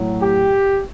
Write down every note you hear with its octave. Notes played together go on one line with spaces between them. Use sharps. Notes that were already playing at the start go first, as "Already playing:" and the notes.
Already playing: A2 F#3
G4